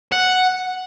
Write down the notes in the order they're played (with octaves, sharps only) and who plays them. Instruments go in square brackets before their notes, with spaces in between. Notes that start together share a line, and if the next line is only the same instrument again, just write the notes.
[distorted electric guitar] F#5